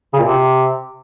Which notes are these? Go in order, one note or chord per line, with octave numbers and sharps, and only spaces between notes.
C#3
A#2
C3